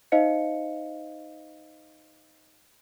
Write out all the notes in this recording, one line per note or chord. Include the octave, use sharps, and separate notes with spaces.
D#4 C5 D#5 F5 C#7